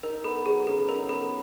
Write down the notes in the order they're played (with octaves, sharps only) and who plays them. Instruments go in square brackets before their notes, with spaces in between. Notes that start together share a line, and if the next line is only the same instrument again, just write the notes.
[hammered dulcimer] D#4 [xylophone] A#4
[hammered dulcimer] B3 [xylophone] A4
[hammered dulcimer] F#3 [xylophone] G#4
[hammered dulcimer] C#3 [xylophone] A4
[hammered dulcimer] D#4 [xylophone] A#4
[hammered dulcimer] B3 [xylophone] A4